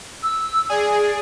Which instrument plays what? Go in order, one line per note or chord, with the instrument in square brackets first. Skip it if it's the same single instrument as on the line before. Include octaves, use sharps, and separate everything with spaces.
[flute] E6
[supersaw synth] G#4 [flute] D5